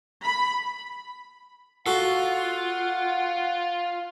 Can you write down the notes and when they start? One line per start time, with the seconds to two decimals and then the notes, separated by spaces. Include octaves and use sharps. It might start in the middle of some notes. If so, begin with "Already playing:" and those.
0.24 B5
1.86 F4 F#4 A4 F#5